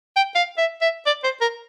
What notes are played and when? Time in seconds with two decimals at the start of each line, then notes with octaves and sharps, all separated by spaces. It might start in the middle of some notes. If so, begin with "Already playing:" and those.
0.16 G5
0.35 F5
0.58 E5
0.81 E5
1.06 D5
1.24 C5
1.41 A#4